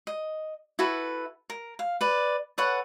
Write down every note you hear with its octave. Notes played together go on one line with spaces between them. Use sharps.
D#5
E4 F#4 A4 B4
A#4
F5
B4 D5
A4 B4 C#5 F#5